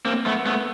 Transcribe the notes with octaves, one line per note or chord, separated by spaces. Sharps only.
A#3 C4
A3 B3
A3 B3